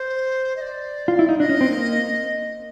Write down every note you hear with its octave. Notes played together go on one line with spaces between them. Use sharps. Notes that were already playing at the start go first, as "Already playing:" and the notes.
Already playing: C5
D#5
D5
F4
E4
D#4
D4 D#5
C#4
C4
A#3